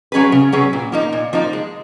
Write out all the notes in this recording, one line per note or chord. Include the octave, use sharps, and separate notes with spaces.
F#3 C#4 G#4 B4
C#3
F#3 C#4 G#4 B4
A#2
F3 A#3 D#4
A#2
F3 A#3 D#4
G#3